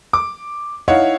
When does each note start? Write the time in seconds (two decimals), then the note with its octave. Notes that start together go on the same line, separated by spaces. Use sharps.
0.13 D6
0.88 D#4 E4 C#5 F5 F#5